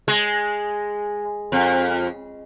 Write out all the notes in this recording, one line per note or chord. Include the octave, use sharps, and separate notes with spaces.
G#3
F2